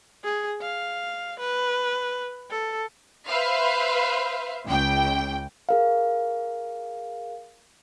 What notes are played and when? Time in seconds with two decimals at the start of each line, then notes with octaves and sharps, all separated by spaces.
0.24 G#4
0.61 F5
1.40 B4
2.50 A4
3.29 B4 C5 E5 F5
4.68 C#2 G5
5.69 G#4 A#4 F5